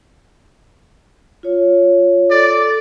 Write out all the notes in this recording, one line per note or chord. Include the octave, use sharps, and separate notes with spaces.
F4 C#5
A4 D5